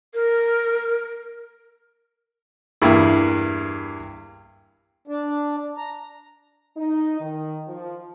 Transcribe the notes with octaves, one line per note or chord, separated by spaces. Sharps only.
A#4
E2 G2 A#3 E4
D4
A#5
D#4
D#3
F3